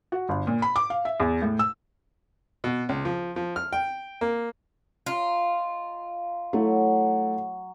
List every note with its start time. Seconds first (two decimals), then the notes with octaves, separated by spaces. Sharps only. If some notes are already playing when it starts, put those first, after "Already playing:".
0.12 F#4
0.29 G1
0.47 A#2
0.62 B5
0.76 D6
0.90 F5
1.05 E5
1.20 E2
1.42 A2
1.59 E6
2.64 B2
2.89 C#2
3.05 F3
3.36 F3
3.56 F6
3.73 G5
4.21 A#3
5.06 F4 D#5 A#5 C6
6.53 F#3 A3 E4